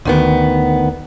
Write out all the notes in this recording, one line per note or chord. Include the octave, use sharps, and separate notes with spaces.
D2 D#3 B3